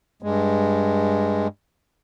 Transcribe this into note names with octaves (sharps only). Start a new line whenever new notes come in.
G2 G#3